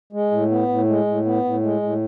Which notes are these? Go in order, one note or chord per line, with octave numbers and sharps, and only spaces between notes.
G#3
A2
B3
A2
G#3
A2
B3
A2
G#3
A2